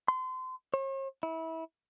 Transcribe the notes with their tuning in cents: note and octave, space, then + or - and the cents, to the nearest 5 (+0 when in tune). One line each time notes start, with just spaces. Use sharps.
C6 -30
C#5 -45
E4 -25